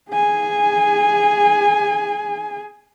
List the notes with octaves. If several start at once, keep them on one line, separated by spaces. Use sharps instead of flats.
G#4 G#5